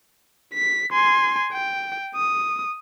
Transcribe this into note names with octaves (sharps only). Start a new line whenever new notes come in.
B6
G#5 C6
G5
D#6